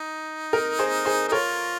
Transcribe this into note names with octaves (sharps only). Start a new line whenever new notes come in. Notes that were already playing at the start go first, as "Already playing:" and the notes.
Already playing: D#4
A#4
G#4 C5
G#4 C5
D#4
F4 A#4 C#5